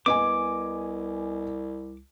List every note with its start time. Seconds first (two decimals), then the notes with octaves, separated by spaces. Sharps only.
0.06 C2 B3 D#5 G#5 D6